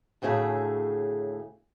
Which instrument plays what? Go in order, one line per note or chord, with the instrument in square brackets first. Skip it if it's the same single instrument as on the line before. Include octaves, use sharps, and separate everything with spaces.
[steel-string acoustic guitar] D2 A2 C#3 G#4 E5